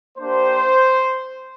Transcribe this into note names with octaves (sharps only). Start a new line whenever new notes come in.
A#3 D4 G4 C5